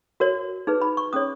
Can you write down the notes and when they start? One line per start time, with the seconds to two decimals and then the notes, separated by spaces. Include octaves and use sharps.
0.20 F#4 A#4 C#5
0.67 D#4 G#4 B4
0.82 B5
0.97 C#6
1.13 C#4 G#4 C#5 D#6